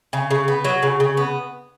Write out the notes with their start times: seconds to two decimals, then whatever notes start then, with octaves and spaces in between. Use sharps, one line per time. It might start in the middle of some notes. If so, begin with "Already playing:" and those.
0.13 C#3
0.31 C#3
0.48 B3
0.65 F#3
0.83 C#3
1.00 C#3
1.17 B3